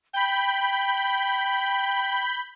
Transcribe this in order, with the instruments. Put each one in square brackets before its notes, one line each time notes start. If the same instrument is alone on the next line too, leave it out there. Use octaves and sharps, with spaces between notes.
[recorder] G5 [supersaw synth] B5 G6